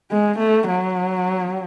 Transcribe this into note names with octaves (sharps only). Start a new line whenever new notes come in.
G#3
A3
F#3